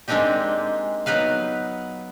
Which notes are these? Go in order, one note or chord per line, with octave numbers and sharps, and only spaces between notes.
G#3 A#3 C4 D4 D#4 G4
F#3 B3 D#4 B4 F5